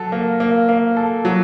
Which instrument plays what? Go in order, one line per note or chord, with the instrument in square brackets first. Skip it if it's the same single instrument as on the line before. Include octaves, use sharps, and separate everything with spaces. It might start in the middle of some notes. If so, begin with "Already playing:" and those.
Already playing: [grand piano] F#3 A4
A#3
A#3
A#3
A4
F#3